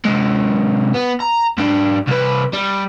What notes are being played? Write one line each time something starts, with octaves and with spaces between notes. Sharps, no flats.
C3 G#3
B3
A#5
G#2 D4
C2 B4
G3